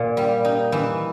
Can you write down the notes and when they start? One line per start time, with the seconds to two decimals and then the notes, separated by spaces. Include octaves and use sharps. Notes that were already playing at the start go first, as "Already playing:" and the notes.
Already playing: A#2
0.17 G3
0.45 D#4
0.72 E3